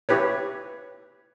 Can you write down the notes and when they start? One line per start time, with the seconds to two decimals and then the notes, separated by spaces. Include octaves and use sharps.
0.09 E4 G4 B4 C#5